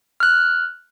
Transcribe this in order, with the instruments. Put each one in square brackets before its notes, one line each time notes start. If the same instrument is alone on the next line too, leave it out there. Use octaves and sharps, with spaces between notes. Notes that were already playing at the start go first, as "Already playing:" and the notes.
[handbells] F6 F#6